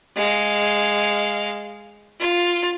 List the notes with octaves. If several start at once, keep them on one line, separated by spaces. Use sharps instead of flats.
G#3 F5
F4